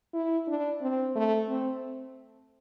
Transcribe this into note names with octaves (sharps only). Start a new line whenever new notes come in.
E4
D4
C4
A3
C4